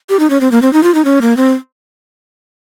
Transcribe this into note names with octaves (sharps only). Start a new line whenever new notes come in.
G4
D#4
C#4
C4
A#3
C4
D#4
F4
D#4
C#4
A#3
C4